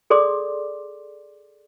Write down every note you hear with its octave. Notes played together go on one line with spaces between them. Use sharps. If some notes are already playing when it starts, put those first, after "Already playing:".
G#4 A4 D5 C6 D6